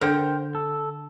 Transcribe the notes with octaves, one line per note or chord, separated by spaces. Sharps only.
D3 A#4 C5 G5
A4